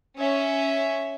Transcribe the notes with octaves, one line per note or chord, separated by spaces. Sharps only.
C#4 E5